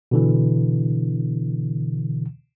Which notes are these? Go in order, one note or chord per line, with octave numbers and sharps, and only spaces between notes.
B2 D3 E3